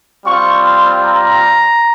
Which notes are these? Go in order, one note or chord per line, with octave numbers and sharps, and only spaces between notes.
G3 C4 F4 C#6
C6
A#5